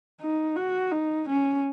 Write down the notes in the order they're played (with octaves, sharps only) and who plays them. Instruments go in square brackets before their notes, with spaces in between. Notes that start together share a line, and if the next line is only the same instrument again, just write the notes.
[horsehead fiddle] D#4
F#4
D#4
C#4